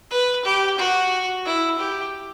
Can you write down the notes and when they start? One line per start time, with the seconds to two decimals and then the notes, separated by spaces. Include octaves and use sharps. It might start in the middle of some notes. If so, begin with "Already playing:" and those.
0.11 B4
0.45 G4
0.78 F#4
1.46 E4
1.79 G4